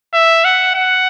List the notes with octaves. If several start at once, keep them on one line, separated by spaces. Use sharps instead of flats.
E5
F#5
F#5